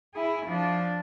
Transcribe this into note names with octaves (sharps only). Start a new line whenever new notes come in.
E4 G#4
F3 D4